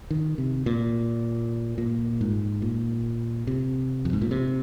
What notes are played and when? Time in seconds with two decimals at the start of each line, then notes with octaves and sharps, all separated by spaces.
0.11 D#3
0.38 C3
0.66 A#2
1.78 A#2
2.21 G#2
2.62 A#2
3.47 C3
4.05 F2
4.13 G#2
4.22 A#2
4.31 C3